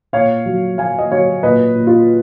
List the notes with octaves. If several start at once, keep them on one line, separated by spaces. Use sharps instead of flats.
A#2 C#5 F5
F#3
F#3 F5 G#5
D#5
F#3 C#5 F5
A#2 B4 D#5
A#2
F4